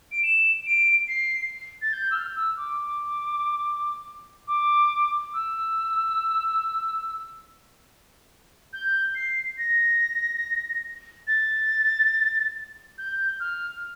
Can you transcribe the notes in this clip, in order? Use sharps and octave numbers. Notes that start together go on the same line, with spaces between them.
D7
E7
D7
C7
A6
G6
E6
F6
E6
D6
D6
E6
G6
C7
A#6
A6
G6
F6